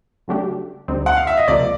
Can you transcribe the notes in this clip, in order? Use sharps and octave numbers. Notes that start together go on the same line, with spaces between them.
C#3 F#3 A3 D4 G4
D2 D3 G3 C4 D#4
F#5
F5
E5
D#5
C#2 C3 F3 A#3 D5